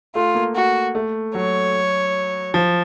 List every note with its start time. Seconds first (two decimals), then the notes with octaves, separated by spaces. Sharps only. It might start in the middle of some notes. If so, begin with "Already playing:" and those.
0.15 A3 F4
0.35 A#3
0.55 F#4
0.95 A3
1.35 F#3 C#5
2.54 F3